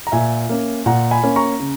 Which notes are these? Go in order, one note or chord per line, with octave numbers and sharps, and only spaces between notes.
A#5
A#2 E5 G#5
A#3 C#4
A#2 F#5 A#5
G#5 B5
A#3 C#4
A#5 C#6
C#3